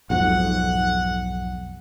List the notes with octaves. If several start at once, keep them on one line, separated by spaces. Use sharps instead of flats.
B1 F2 G#2 F#5